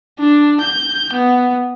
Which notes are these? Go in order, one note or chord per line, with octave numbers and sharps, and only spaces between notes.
D4
G6
B3